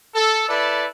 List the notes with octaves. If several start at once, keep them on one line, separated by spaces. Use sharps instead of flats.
A4
E4 A4 B4 D5